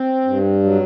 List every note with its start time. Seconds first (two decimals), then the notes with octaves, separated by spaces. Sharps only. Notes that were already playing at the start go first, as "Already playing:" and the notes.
Already playing: C4
0.25 G2
0.63 F#3